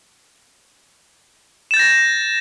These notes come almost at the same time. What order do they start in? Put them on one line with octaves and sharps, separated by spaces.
E7 A6 G6 A#6